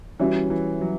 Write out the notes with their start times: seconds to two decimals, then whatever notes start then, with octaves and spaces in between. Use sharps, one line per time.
0.19 E3 G3 C#4 F#4 C#5 E5
0.50 E3
0.81 F#3